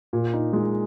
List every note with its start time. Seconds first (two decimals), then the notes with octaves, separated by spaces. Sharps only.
0.13 A#2
0.33 D#4
0.53 G#3